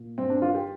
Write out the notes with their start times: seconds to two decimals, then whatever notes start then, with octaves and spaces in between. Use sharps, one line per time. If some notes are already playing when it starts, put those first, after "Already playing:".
Already playing: A#2
0.18 G2 C4
0.30 D4
0.42 D#3 F4
0.54 G4